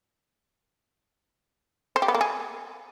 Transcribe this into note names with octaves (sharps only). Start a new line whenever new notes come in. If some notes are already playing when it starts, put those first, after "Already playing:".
C5
G4
B3
A#3
G#4